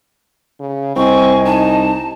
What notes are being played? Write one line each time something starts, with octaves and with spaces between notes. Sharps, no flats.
C#3
C2 C4 D#5 G#5 C#6
D#4 A5